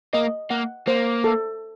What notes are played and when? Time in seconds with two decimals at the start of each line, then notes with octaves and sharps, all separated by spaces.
0.13 A#3 D#5
0.50 A#3 F#5
0.87 A#3 C5
1.24 A4